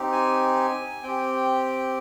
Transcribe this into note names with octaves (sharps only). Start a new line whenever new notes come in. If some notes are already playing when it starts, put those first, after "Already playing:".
Already playing: C4 D#4 G4
G#5
C4 G4 G5